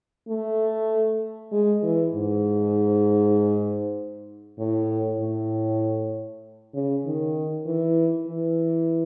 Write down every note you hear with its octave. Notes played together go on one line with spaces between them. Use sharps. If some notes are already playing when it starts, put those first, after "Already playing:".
A3
G#3
E3
G#2
A2
A2
C#3
D#3
E3
E3